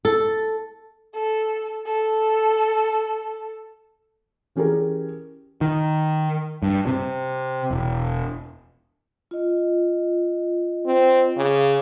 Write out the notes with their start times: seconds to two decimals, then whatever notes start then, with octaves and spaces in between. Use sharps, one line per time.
0.05 A4
1.14 A4
1.86 A4
4.56 E3 C#4 G4 G#4 A#4
5.61 D#3
6.62 G2
6.87 C3
7.71 E1
9.31 F4 D#5
10.86 C4
11.37 C#3 F5 D6